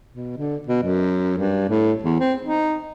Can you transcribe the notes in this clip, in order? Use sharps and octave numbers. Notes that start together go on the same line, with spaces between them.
B2
D3
B2
F#2
G2
A2
E2
C4
D#4